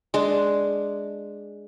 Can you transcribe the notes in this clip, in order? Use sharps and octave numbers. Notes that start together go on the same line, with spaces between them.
G#3 D4